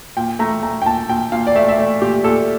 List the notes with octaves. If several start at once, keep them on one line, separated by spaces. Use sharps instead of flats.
A#2 G5
A3 A#5
A3 A#5
G5
A#2 A5
A#2 G5
A#2 F5
D5
A3 E5
E5
A3 D5
A#2 G4
A#2 A4